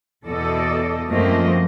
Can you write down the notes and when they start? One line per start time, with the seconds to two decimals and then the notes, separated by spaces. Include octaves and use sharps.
0.25 E2 B2 A4 D5 D#5
1.10 F#2 F3 A3 A#3 C4 D#5